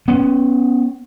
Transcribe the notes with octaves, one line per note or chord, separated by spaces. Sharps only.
B3 C#4